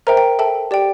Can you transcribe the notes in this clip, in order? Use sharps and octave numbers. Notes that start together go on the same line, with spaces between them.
A#4 C5 E5 G5 A#5
G5
A4 E5 G5 A5
G4 D5 G5